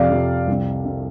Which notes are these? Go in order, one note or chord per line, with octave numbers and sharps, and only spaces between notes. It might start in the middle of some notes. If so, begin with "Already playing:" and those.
Already playing: F2 C3 D5 F5
F2 C3
C2 C3
C3